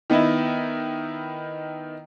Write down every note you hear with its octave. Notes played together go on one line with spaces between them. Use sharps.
D#3 B3 D#4 E4